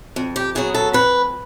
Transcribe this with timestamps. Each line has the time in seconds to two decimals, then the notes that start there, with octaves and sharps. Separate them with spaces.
0.16 F2
0.36 G4
0.55 C#3 F#3 B3 G#4
0.74 A4
0.93 F2 B4